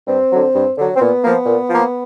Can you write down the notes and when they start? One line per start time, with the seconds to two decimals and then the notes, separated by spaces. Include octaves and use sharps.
0.08 G2 C4
0.31 D3 F#3
0.55 G2
0.78 D3 F#3
0.96 C4
1.00 A#2 B3
1.23 F3 A#3
1.46 A#2
1.69 F3 A#3